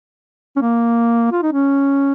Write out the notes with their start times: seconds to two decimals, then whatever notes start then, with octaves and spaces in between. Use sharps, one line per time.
0.56 C#4
0.61 A#3
1.32 F4
1.42 D#4
1.53 C#4